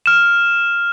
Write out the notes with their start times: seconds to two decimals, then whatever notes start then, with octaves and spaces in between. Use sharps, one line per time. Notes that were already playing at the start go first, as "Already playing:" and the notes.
0.06 F6 E7